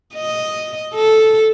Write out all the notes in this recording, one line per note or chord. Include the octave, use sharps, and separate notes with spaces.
D#5
A4